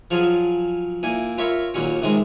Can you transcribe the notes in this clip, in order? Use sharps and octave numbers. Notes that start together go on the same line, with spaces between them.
F3 F#3 F4 G#4
A#2 E4 G#5
F4 A#4 C#5 E5 B5 C#6
D#2 A#2 F#3 C#4
C3 D#3 G#3